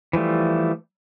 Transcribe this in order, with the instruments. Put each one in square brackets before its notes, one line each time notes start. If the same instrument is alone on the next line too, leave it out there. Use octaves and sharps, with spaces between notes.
[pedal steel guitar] E3 F3 G3 A3